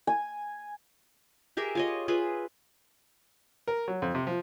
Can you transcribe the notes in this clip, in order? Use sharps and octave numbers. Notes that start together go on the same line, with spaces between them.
G#5
G4 G#4 A#4 E5
F4 C#5 D#5
F4 G#4 B4 E5
A#4
F#3
F2
C3
F3